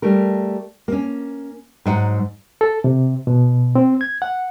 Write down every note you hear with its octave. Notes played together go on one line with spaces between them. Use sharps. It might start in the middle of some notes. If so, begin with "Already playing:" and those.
G3 A3 A#4
A#3 C#4
G#2 F#3 F#5
A4
C3
B2
C4
G#6
F#5